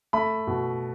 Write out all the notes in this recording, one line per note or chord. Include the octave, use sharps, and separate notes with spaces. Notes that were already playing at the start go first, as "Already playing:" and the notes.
A3 B5
B2